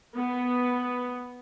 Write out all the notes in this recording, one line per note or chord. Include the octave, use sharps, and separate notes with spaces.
B3